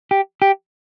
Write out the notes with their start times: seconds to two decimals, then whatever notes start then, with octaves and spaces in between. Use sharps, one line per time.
0.11 G4
0.42 G4